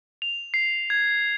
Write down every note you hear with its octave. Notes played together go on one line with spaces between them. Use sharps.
F7
C7
G#6